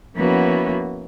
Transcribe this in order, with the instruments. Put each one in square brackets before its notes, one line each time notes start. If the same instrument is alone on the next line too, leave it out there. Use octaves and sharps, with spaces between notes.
[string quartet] F3 A#3 B3 C#4 E4 F#4